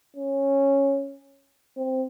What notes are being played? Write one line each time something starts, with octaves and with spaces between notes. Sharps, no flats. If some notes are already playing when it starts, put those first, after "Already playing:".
C#4
C4